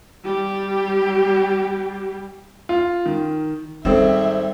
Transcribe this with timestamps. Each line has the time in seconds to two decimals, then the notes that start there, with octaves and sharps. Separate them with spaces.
0.25 G3 G4
2.69 F4
3.06 D#3
3.85 G#1 G3 C4 A4 E5 E6 E7